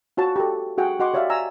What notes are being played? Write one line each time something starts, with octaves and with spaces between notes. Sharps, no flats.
F4 F#4 C#5 A5
G4 A4
F#4 G#4 F#5 G5
F#4 D#5 F#5 C6 D6
G4 C#5 D5 E5 F5
E5 G#5 A#5 E6